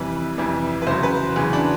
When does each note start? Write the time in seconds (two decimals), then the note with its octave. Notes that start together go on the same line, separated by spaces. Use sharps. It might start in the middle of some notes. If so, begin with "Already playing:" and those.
Already playing: F2 C3 E3 G3 B4
0.37 F2 C3 E3 G3
0.82 B4
0.87 E2 C#3 F#3 C5
1.03 B4
1.36 E2 C#3 F#3 G#4
1.53 D4